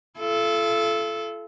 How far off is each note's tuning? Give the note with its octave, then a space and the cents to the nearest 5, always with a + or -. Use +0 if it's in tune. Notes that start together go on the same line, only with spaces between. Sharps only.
F4 -45 A4 -15